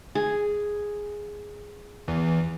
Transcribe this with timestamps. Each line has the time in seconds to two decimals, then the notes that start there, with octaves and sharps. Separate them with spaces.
0.15 G#4
2.08 E2 E3